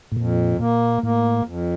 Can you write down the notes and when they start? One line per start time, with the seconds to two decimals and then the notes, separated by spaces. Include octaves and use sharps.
0.12 A2
0.17 F2 A#2
0.59 A#2 A#3
1.03 A2 A#3
1.45 F2